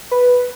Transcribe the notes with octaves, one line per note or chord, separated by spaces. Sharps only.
B4